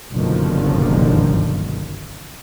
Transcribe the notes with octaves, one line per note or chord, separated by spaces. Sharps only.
F#1 B1 G2 D3 D#3 F3